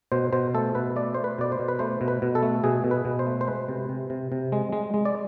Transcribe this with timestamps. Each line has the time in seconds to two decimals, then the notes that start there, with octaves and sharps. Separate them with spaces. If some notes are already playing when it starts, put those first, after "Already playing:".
0.12 B2 C5
0.33 B2 C5
0.54 A3 A4
0.75 B2 B4
0.96 A3 D5
1.15 A3 C5
1.24 B4
1.38 B2 D5
1.52 C5
1.59 B2
1.68 B4
1.79 A3 C5
2.01 B2
2.08 B4
2.22 B2
2.35 A4
2.42 A3
2.64 B2 G#4
2.84 B2
2.91 B4
3.05 B2
3.19 C5
3.27 A3
3.41 C5
3.47 G#3 B4
3.69 C3
3.89 C3
4.10 C3
4.32 C3
4.52 G#3
4.73 G#3
4.94 G#3
5.05 D5